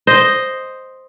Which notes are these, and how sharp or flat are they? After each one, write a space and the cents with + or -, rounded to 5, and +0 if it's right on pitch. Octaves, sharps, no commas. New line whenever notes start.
C5 +0 D#5 +0